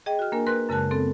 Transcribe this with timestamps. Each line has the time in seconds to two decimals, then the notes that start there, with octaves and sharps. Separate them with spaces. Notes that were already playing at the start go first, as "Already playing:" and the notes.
0.06 G#4 D#5 G5
0.19 F#4 F6
0.32 A#3 D4 A#4 G#5
0.47 A#4 B4 C6 F#6 A#6
0.69 F#2 C#3 G#3 A#4 A5 F#6
0.91 B3 C4 A4